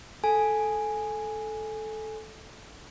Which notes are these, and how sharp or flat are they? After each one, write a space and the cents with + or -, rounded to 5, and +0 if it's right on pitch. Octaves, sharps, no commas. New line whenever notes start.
A4 -10 G#5 +0